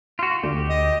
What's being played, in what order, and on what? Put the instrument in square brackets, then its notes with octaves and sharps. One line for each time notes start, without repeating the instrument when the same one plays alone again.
[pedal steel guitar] F4 F#4
[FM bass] D2 [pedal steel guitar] G4
[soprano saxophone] D#5